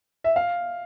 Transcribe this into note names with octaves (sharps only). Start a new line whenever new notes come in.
E5
F5